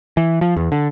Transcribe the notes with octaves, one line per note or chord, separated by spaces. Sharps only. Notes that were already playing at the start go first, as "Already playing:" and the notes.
E3
F3
E2
D3